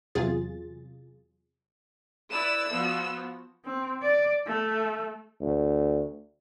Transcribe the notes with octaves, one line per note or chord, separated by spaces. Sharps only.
E2 C3 F#3 F4 G#4 A6
E4 B4 D5 E6 E7
F3 B3 F#4
C4
D5
A3
D2